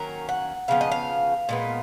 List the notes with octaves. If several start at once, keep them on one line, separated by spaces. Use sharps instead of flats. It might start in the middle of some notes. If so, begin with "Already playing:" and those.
Already playing: D#3 F#3 A#3 C#4 A#4
F#5
C#3 F3 B3 F5
D#5
F5
A#2 G#3 B3